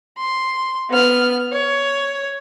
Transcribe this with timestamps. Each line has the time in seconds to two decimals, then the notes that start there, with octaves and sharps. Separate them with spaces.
0.18 C6
0.90 B3 F6
1.52 C#5